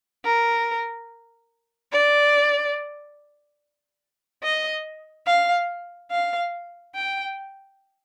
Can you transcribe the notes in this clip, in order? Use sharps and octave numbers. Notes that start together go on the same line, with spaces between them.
A#4
D5
D#5
F5
F5
G5